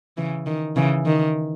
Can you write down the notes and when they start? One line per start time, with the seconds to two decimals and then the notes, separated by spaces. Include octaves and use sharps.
0.17 C#3 E3
0.47 D#3
0.76 C#3 E3
1.06 D#3